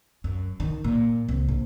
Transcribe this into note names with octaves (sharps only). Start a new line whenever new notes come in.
F#2
D#3
A#2
C2
A#1